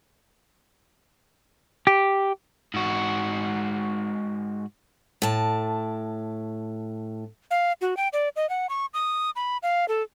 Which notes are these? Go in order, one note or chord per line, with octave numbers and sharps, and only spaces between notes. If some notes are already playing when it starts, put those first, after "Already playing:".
G4
G#2 F#4
A2 A5
F5
F#4
G5
D5
D#5
F#5
C#6
D#6
B5
F5
A4